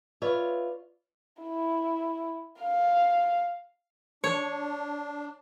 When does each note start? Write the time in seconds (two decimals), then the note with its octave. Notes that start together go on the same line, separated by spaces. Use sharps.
0.22 F4 B4 C#5 D5 E5
1.42 E4
2.61 F5
4.24 D4 C#5